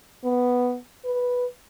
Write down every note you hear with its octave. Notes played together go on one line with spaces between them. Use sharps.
B3
B4